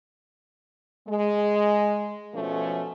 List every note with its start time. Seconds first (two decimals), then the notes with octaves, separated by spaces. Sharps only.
1.08 G#3
2.33 B2 F3 A3 C#4